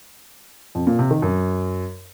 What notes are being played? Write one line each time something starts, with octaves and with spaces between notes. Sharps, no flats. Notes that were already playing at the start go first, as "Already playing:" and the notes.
F2
A#2
C3
D#3
F#2